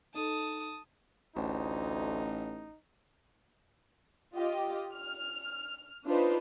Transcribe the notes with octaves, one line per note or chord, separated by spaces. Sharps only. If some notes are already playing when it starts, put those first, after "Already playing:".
D#4 A4 A5 D#6
A1 D2 D#4
F4 G4 D#5
F6
D4 D#4 F4 B4 C5